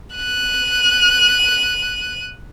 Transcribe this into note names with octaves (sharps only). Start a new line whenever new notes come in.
F#6 D#7